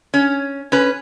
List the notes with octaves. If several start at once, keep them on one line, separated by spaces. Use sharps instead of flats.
C#4
C#4 B4